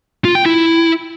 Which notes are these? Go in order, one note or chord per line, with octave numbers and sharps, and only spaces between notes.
F4
G5
E4